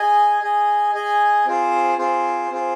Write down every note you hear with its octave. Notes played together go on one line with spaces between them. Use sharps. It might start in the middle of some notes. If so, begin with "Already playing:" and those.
Already playing: G#4 D#5 G#5
G#4 D#5 G#5
G#4 D#5 G#5
C4 F4 G#4 C5
C4 F4 G#4 C5
C4 F4 G#4 C5